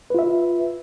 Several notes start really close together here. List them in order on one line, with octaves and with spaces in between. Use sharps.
B4 F4 E5